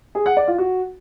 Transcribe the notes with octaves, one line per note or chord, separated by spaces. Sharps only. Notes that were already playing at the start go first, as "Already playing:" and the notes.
G#4
F#5
D5
F4
F#4